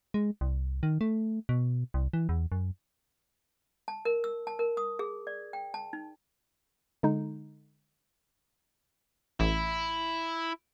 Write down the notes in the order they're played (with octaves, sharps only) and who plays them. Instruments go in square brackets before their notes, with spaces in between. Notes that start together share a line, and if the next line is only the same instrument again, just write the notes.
[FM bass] G#3
C2
D#3
A3
B2
C2
E3
E2
F#2
[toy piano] A5
A#4
E6
A5
A#4
D#6
G#4
D5
G5
A5
D#4
[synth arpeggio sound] D3 G#3 D#4
[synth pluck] A1 [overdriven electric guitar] E4